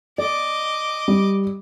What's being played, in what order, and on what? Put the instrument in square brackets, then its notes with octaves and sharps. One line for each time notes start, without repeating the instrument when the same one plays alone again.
[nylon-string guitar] D5 [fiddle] D#5 D6
[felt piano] G3